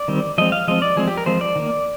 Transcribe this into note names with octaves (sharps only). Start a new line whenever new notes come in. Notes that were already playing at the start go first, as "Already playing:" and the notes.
Already playing: D5
D#3 G3 C4
F3 G#3 C4 D#5
F5
F3 G#3 C4 D#5
D5
F3 G#3 C4 G#4
G4
A#4
F3 G#3 C4 C5
D5
D#3 A#3